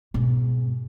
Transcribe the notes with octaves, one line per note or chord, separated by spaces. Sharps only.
G#2 B2